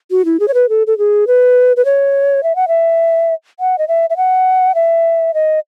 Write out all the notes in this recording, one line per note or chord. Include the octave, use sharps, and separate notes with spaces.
F#4
E4
G#4
C#5
B4
A4
A4
G#4
B4
B4
C#5
E5
F#5
E5
F#5
D#5
E5
E5
F#5
E5
D#5